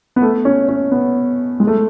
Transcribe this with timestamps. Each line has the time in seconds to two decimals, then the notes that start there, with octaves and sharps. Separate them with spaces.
0.16 B3
0.22 A3
0.45 C#4
0.69 C#4
0.92 B3
1.60 G#3
1.67 A3